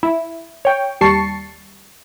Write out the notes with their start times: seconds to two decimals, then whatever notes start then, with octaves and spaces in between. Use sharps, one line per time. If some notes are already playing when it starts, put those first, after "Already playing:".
0.03 E4
0.65 C#5 G5
1.01 D#2 G3 A5 C#6 C7